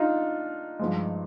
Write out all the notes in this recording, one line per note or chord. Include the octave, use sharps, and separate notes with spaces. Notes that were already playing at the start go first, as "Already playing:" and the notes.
Already playing: D4 D#4 F4
G2 F3 G#3